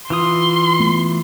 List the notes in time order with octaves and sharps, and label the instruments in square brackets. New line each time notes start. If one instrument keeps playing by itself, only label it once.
[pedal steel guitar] E3 F4 D#6 [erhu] C6
[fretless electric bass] A3 B3